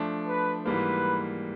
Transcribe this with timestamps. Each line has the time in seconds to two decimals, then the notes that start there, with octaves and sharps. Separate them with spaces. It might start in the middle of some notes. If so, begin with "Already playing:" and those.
Already playing: F3 A3 D4
0.27 B4
0.66 G#2 E3 G3 A#3 B4